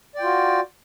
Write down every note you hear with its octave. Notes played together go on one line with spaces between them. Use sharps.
F4 F#4 D5 G5